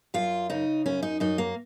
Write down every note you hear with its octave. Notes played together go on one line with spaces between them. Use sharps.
F#2 F4
C#3 D#4
F#2 C#4
D#4
F#2 D#4
A#3